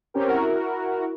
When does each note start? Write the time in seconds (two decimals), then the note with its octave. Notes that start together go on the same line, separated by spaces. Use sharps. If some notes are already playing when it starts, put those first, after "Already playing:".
0.14 C4 C#4 G4 A#4
0.28 E4 F#4 A#4